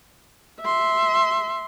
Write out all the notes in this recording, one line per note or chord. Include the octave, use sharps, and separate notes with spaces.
E5 C6